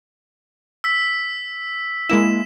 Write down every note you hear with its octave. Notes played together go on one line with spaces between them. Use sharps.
E6 B6
G#3 A#3 E4 E7